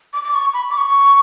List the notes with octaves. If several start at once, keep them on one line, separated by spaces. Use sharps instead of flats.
D6
D6
C#6
B5
D6
C#6